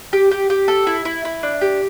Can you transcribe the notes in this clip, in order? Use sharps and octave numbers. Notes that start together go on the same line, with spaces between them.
G4
G4
G4
A4
E4
E4
E4
D4
G4